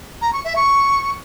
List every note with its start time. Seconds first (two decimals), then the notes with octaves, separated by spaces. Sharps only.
0.22 A#5
0.33 C#6
0.44 E5
0.56 C#6